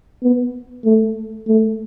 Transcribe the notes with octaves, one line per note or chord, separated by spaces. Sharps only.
B3
A3
A3